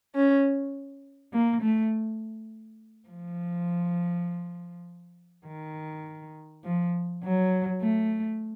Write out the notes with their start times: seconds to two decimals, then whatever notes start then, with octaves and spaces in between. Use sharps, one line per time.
0.15 C#4
1.33 A#3
1.61 A3
3.09 F3
5.45 D#3
6.64 F3
7.23 F#3
7.82 A3